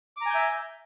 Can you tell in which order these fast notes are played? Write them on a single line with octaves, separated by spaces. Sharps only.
D6 A#5 G#5 G6 E5